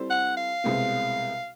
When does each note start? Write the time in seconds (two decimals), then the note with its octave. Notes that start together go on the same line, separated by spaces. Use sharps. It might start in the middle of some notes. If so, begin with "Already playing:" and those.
Already playing: G3 C4 E4 A4 C5
0.10 F#5
0.37 F5
0.64 C2 B2 G#3 C4